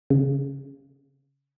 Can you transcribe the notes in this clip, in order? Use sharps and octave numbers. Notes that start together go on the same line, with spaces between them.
C#3